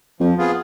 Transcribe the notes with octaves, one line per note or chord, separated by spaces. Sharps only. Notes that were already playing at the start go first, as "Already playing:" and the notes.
F2 F3
B3 F4 G#4